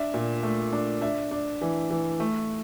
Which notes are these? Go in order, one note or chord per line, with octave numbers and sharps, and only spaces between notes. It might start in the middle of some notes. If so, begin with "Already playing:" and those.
Already playing: D4 E5
A#2
A3
D4
D4 E5
D4
E3
E3
A3